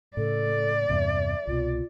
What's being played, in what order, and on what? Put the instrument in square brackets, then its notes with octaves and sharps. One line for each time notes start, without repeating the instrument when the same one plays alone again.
[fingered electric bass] A2 C#3 [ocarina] A4 [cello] D5
[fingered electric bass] E2 G2 C3 [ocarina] E5
[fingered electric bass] C2 B2 [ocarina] F4